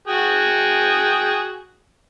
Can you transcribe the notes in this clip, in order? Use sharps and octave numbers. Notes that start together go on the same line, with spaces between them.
F#4 G#4 G5